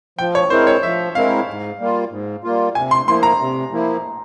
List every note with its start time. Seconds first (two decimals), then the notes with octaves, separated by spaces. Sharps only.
0.19 F3 G5
0.35 C#5
0.50 G#3 C4 E4 A#4 C5
0.67 C#5
0.83 F3 E5
1.15 G#3 C4 E4 A#4 F5
1.47 G#2
1.79 G3 A#3 F4
2.11 G#2
2.44 G3 A#3 F4
2.75 C3 G#5
2.91 C6
3.07 F3 A#3 E4 C6
3.23 A#5
3.39 C3
3.72 F3 A#3 E4